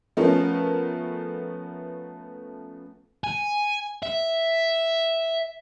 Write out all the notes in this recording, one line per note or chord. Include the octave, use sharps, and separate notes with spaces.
F3 A3 B3 C#4 A#4
G#5
E5